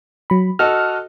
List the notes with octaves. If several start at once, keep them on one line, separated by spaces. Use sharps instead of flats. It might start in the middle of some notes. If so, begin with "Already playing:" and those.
F#3 B5
F#4 A4 D#5 F6